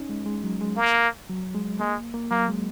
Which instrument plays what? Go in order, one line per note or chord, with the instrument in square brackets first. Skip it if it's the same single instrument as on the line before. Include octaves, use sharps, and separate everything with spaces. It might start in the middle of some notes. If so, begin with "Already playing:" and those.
Already playing: [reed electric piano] C#4 D#4
G#3
G#3
F#3
G#3
[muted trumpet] A#3
[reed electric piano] F#3
G#3
[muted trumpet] G#3 [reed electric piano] A#3
[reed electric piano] A#3
[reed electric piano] F#3 [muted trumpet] A#3
[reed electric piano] G#3